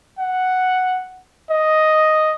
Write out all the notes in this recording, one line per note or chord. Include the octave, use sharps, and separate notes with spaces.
F#5
D#5